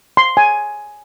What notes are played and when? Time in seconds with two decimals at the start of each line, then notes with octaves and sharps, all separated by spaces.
0.17 C6
0.37 G#5